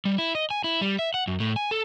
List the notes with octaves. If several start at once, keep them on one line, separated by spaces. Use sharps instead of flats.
G3
E4
D#5
G#5
E4
G3
E5
F#5
F#2
A2
G#5
A4